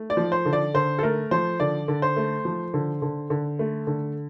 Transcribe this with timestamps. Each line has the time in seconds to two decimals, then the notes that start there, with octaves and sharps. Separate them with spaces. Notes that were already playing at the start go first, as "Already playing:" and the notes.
Already playing: A3
0.10 D5
0.17 F3
0.32 C5
0.46 D3
0.53 D5
0.74 D3 C5
0.99 A4
1.03 A3 A#4
1.31 F3 C5
1.60 D3 D5
1.88 D3
2.02 C5
2.17 A3
2.45 F3
2.74 D3
3.02 D3
3.30 D3
3.59 A3
3.87 D3